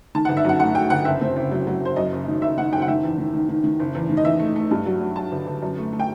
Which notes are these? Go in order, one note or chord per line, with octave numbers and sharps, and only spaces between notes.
D#3 A5
F#5
G1
E5
F#2 F#5
A3 F#5
A3 G5
G1 F#5
F#1 E5
C4
F#1
F#3
F#3
F#1 C5
F#2 D#5
F#1
D#3
F#1 E5
D#3 F#5
F#1 G5
F#5
D#3 E5
E2
D#3
D#3
D#3
D#3
F#1
E2
D#3
D#5
E2 E5
A3
A3
G2
F#3
F#3
F#3 A5
G1
G1
F#2
A3
A3
G5